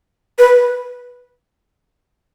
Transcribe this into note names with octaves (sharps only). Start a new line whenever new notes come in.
B4